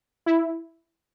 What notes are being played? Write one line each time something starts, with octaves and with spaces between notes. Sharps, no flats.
E4